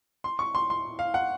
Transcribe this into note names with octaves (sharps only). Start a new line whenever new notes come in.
C6
C#6
C6
C6
F5
F#5